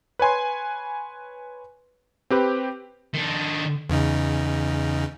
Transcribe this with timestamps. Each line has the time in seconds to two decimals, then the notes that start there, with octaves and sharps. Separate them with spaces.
0.19 B4 C#5 G#5 C6
2.30 C4 G4 B4
3.14 D#3 D4
3.90 E2 C#3 D#4